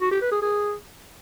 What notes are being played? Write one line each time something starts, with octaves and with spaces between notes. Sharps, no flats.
F#4
G4
B4
G#4
G#4